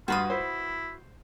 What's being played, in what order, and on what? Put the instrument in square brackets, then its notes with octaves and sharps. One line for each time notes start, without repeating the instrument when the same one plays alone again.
[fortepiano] G2 [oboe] F4 [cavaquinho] F#4 B4 D#6
[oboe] E4 [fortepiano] C5